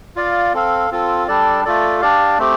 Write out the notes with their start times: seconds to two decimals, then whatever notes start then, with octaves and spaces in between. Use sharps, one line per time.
0.16 F4 D5 F5
0.53 C4 A4 F5
0.91 C4 F4 A4
1.28 G3 D4 A4 D5
1.65 A3 F4 A4 D5
2.01 D4 G4 D5 F5
2.38 A3 C4 G4